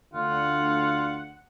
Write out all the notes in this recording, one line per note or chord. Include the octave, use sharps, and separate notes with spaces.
D2 D3 F4 F#5